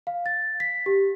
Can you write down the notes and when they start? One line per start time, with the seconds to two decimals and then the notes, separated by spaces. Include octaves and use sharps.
0.07 F5
0.26 A6
0.60 B6
0.86 G4